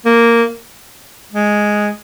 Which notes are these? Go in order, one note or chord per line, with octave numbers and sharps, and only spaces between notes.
A#3
G#3